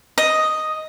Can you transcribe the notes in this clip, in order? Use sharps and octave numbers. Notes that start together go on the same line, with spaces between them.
D#5